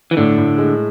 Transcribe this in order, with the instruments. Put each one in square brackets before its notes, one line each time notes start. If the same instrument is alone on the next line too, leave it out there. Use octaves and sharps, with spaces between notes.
[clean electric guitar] E3
[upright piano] A2 [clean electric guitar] D3
[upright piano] A2
G#3